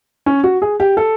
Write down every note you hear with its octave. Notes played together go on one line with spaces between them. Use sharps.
C#4
F#4
G#4
G4
A4